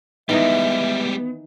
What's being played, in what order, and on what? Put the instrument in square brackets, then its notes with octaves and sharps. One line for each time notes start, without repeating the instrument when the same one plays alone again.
[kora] D#3 E3 D#4 [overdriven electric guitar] G3 G#3 [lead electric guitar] B3 [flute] E5